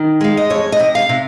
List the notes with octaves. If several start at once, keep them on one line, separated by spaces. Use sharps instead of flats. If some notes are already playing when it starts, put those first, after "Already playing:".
Already playing: D#3
G#3 F5
D#5
F2 C#5
D#5
C3
F5
C3